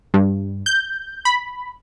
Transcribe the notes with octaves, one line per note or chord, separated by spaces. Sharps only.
G2
G6
B5